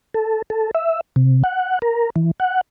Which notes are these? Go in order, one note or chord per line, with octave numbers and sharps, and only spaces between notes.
A4
A4
E5
C3
F#5
A#4
E3
F#5